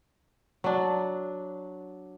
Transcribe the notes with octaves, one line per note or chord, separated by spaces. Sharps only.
F#3 D4